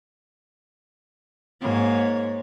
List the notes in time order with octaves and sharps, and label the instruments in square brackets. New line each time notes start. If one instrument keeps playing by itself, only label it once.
[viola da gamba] G#2 A#3 C#5